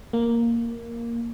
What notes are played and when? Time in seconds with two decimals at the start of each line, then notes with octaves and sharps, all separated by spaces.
0.13 A#3